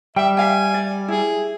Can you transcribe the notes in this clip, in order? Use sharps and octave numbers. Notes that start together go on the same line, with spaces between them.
G3 E5 G5
E5 F5 G5 G#5
D5
E4 G#4